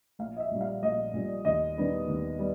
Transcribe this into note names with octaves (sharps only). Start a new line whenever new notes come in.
A#1 F5
D#5
E5
A#2 G3
F5
A#1 D#5
A#2 G3
D#2 D#5
D#3 G3 B3 D4
D#2
G3 B3